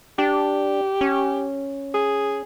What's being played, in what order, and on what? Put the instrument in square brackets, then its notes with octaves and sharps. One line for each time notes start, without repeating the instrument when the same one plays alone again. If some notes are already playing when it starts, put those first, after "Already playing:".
[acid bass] D4 [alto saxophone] G4
[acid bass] C#4
[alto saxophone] G#4